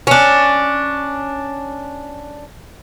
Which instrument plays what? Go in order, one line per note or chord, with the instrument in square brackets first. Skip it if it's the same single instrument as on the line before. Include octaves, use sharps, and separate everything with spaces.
[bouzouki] C#4 D4